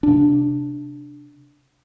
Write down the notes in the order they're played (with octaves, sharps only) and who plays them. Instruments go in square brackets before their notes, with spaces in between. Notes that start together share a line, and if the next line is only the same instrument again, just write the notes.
[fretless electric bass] C3 D4